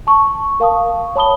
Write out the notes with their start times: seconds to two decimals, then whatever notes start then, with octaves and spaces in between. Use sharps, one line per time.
0.07 A5 C#6
0.60 A#4 F5 A5 C#6 D#6
1.16 C#5 A5 B5 D#6 G7